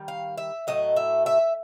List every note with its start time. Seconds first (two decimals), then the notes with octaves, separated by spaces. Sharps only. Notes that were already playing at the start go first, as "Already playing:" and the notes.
Already playing: D#3 G3
0.08 F5
0.38 E5
0.67 A2 F#3 A3 D#5
0.96 E5
1.26 E5